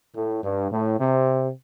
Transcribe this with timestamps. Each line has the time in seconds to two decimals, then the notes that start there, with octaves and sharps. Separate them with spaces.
0.16 A2
0.44 G2
0.72 A2
1.00 C3